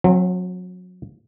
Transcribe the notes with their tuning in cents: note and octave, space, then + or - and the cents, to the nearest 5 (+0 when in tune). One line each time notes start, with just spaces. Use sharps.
F#3 -30 C4 +30